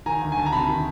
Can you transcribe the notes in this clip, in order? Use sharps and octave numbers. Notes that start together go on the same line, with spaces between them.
D#3 G#5 A#5
D2
G#5
D2 A5
A#5
C3 A5 B5
D#3